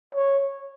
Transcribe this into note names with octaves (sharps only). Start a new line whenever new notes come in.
C#5